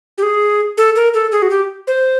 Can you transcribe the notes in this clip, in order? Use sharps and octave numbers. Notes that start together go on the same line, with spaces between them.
G4
G#4
A4
A#4
A4
G#4
F#4
G4
C5